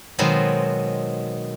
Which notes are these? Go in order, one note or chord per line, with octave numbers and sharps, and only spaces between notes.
B2 D#3 F#3 G#3 B3 C4